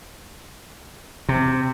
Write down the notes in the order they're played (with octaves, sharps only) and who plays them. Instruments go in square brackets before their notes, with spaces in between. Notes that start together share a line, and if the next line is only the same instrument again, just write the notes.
[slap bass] C3